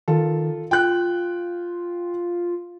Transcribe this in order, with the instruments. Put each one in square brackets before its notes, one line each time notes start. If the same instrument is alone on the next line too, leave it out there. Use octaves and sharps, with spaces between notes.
[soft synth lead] D#3 [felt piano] F4 A4
[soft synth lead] F4 [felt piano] G5 F#6